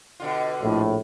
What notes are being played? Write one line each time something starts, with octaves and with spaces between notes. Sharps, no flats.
B2 D3 F4
A#1 A2